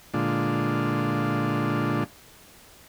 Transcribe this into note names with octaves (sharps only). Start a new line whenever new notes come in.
A#2 D3 G#3 D4 F4